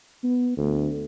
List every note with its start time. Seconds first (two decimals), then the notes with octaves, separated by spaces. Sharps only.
0.24 B3
0.57 D2